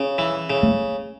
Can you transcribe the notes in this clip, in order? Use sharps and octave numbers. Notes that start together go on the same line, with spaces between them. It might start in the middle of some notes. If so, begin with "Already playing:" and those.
Already playing: C#3 C#4
E3
C#3
A3